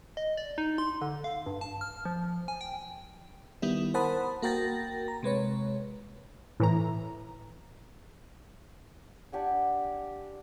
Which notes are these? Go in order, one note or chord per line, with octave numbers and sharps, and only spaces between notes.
D#5
D5
D#4
C6
D3
F5
G2
A5
F6
F3
G#5
G5
D#3 G3 B3 E4
A#4 C5 F#5 A5 B5 D#6
A#3 F#4 A#4 G5 A6 A#6
A#5
C3 G#3 B4 C#5
A2 E3 A#5
D4 G4 F#5 G#5